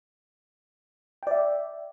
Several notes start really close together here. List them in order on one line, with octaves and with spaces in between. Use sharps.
G5 D5 E5